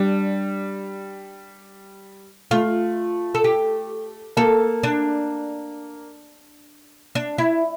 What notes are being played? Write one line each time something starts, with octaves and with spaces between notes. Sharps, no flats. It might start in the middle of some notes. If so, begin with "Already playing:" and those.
Already playing: G3 D4
A3 F4
A4
G4
A#3 A4
D4
D4
E4